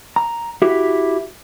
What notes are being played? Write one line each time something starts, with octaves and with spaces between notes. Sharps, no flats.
A#5
E4 F#4 G4